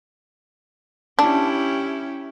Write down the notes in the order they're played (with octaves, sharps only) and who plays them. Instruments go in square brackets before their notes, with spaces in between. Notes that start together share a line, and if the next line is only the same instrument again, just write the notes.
[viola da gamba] C#4 E4 G4 [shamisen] D4